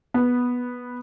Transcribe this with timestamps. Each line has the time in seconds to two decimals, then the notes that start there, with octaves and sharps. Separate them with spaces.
0.14 B3